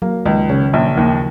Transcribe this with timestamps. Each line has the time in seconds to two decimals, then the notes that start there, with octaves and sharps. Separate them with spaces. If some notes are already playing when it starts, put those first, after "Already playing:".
0.02 F#3 A#3
0.26 C#2 D#3
0.49 C#3 C#4
0.73 A#1
0.97 D#2 F3